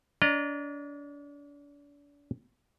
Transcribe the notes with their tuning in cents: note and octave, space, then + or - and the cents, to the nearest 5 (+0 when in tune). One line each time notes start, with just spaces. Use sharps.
D4 -35 D#5 -40 A#5 +0